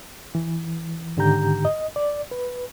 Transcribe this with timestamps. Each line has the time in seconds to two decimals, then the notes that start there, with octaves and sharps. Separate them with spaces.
0.35 E3
1.17 G#2 D3 D#3 G4 A#5 G6
1.65 D#5
1.96 D5
2.31 B4